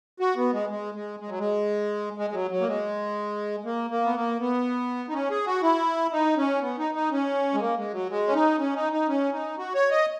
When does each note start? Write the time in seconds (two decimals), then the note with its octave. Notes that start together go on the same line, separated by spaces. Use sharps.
0.20 F#4
0.36 B3
0.53 G#3
0.70 G#3
0.94 G#3
1.20 G#3
1.29 F#3
1.39 G#3
2.17 G#3
2.30 G#3
2.34 F#3
2.51 F#3
2.61 A#3
2.67 G#3
3.65 A#3
3.90 A#3
4.05 B3
4.15 A#3
4.40 B3
5.09 D#4
5.14 C#4
5.31 G#4
5.47 F#4
5.63 E4
6.12 D#4
6.37 C#4
6.62 B3
6.79 D#4
6.95 D#4
7.12 C#4
7.54 G#3
7.60 A#3
7.77 G#3
7.93 F#3
8.10 G#3
8.27 C#4
8.34 D#4
8.59 C#4
8.75 D#4
8.93 D#4
9.08 C#4
9.33 D#4
9.58 F#4
9.75 C#5
9.91 D#5